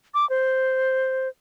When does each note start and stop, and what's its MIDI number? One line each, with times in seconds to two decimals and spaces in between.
0.14 0.28 86
0.30 1.28 72